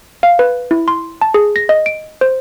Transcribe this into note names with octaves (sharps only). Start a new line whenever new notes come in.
F5
B4
E4
C6
A5
G#4
A#6
D#5
D7
C5